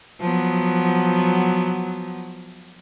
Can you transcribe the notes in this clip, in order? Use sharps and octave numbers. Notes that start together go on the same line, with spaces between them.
F3 F#3 B3